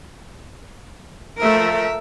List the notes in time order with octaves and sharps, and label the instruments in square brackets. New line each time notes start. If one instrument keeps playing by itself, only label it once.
[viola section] F3 A3 [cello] A#4 E5